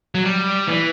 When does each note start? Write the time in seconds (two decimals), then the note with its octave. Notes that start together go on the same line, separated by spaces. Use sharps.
0.15 F#3
0.24 G3
0.67 E3